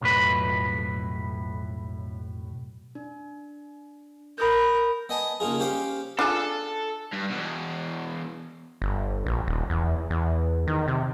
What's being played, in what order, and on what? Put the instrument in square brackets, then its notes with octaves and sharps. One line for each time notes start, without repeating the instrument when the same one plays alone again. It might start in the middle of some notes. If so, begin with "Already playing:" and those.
[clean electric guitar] B1 F2 A2 B4
[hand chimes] D4
[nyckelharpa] A#4 [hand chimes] B5 D#6 G6
[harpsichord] B3 D#5 G#5 A5
C#3 A#3 D#4 F4 G#4
C#4 G4 C5 F5 D6
[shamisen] D4 F4 G#4 [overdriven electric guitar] A4
[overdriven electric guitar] G2
E2 B2
[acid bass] G1
A#1
D#1
E2
E2
D#3
C3